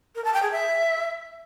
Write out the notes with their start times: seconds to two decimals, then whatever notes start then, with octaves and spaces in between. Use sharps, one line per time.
0.15 A#4
0.25 A5
0.34 G5
0.43 G#4
0.52 E5